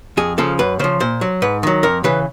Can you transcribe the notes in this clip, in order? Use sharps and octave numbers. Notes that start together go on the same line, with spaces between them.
F2 G#4
C#3 F3 A4
F#2 B4
C#3 F3 C5
A#2 C5
F#3
G#2 B4
D#3 F#3
F2 A#4
C#3 E3 B4